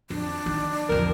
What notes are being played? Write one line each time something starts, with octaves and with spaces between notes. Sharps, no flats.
F2 D4
D#3
C2 F2 A#4